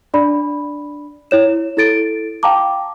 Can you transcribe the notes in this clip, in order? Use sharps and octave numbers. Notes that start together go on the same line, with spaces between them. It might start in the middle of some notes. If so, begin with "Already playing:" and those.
D4 D5 B5
E4 C#5 E7
E4 A4 A6 D7
F5 G5 A5 A#5 D6